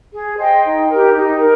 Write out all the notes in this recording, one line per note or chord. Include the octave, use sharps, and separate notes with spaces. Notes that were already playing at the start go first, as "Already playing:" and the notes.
G#4
C5 D#5 G5
D#4
G4 A#4
D#4
A#4